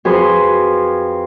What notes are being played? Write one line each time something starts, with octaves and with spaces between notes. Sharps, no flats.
F2 F#4 G#4 B4 C6